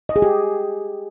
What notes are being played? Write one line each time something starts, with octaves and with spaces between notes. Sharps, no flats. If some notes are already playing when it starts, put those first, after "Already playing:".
D#5
G#4
G4